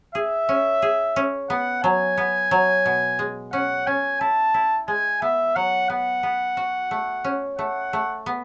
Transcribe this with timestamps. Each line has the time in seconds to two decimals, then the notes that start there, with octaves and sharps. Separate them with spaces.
0.15 G#4 E5
0.49 C#4
0.82 G#4
1.16 C#4
1.50 B3 F#5
1.84 F#3 G#5
2.18 B3
2.51 F#3
2.86 B2
3.19 G#3
3.53 C#4 F#5
3.87 C#4 G#5
4.21 E4 A5
4.54 E4
4.88 G#3 G#5
5.22 B3 E5
5.56 F#3 F#5
5.90 B3 F#5
6.23 B3
6.57 F#4
6.91 A3
7.24 C#4
7.58 A3 F#5
7.93 A3
8.26 B3